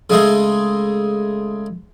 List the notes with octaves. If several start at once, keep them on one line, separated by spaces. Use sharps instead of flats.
C#3 G#3 A3